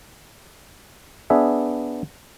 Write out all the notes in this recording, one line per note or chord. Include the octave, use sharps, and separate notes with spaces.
B3 D4 G#4 E5